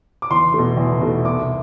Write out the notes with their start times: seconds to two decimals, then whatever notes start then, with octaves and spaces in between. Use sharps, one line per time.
0.22 D6
0.31 E2 C6
0.54 B2 A3
0.77 E2
1.01 B2 A3
1.25 C2 D6